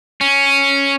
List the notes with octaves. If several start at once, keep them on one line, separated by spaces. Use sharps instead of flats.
C#4